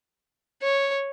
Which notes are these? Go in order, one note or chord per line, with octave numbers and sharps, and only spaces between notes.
C#5